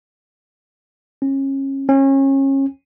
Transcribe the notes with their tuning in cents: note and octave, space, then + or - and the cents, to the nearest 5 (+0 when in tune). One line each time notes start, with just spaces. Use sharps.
C#4 -30
C#4 -30